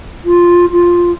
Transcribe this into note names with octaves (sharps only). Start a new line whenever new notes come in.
F4
F4